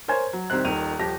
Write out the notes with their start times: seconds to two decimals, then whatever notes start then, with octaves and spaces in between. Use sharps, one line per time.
0.08 A#4 C5 C#5 G#5 G#6
0.33 F#3
0.50 C2 C3 D#3 C4 F#6
0.64 D#1 D#3 D#7 F7
0.99 D#1 F3 G4 A5 A#6